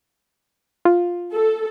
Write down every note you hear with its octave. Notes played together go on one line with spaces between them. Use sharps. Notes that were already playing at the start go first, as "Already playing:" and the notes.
F4
A4